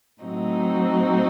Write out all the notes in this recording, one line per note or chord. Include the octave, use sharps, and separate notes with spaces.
A2 F#3 C4 D#4 F#4